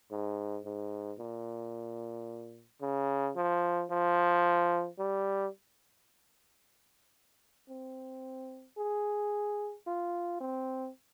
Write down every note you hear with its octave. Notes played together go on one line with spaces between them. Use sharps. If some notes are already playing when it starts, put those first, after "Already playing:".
G#2
G#2
A#2
C#3
F3
F3
G3
C4
G#4
F4
C4